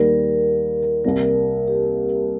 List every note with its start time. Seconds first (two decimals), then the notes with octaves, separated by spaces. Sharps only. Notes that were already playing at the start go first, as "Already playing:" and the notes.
Already playing: D#2 D#3 G3 A#4
1.04 C2 C3 G3 A#3 A#4
1.68 G4